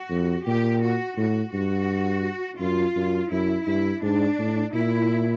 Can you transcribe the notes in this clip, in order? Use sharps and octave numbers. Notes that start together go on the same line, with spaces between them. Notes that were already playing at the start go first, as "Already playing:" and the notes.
Already playing: F#4
F2
A#2 G4
F#4
A2 F#4
G2 F#4
F#2 F4
F#2
F#2 E4
G2 E4
G#2 D4
A2
A#2 E4